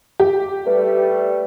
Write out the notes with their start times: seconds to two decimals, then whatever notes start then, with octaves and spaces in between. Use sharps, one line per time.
0.20 G4
0.67 G3 A3 B4